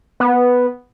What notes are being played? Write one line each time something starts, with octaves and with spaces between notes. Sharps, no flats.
B3